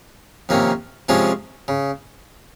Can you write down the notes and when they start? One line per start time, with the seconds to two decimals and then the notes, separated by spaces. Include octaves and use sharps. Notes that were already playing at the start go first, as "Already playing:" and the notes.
0.49 F2 C3 D#3 A#3 C#4
1.09 C3 F3 G#3 C#4 F4
1.68 C#3